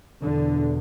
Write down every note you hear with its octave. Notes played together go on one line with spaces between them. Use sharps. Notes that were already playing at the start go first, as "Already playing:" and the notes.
E2 B2 D3